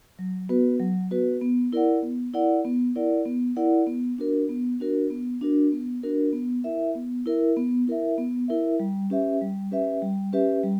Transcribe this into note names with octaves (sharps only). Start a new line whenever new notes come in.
F#3
B3 F#4 B4
F#3
B3 F#4 B4
B3
E4 A#4 D5 F#5
B3
E4 A#4 D5 F#5
B3
E4 A#4 D5 F#5
B3
E4 A#4 D5 F#5
B3
D4 F#4 A#4
B3
D4 F#4 A#4
B3
D4 F#4 A#4
B3
D4 F#4 A#4
B3
E4 A#4 E5
B3
E4 A#4 E5
B3
E4 A#4 E5
B3
E4 A#4 E5
G3
C#4 G4 B4 E5
G3
C#4 G4 B4 E5
G3
C#4 G4 B4 E5
G3